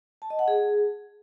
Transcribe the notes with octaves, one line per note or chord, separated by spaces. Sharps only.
A5
D#5
F#5
G#4